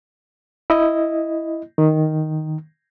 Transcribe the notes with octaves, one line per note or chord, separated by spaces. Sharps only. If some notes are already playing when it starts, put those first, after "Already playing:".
E4 D#5
D#3